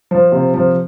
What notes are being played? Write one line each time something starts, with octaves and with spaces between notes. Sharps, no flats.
F3
C3
F3